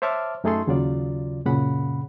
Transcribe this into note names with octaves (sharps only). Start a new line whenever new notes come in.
C5 C#5 E5 A5 D6 F6
F#2 A3 D#4 G#4 A4 C6
D#2 C#3 F#3 F4 D5
F#2 A#2 C#3 F#5 B5